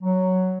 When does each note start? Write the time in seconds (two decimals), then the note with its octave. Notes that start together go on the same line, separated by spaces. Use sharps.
0.02 F#3